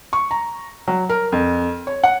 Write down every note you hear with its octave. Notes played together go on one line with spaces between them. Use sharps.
C#6
A#5
F#3
A#4
F2
C#5
F#5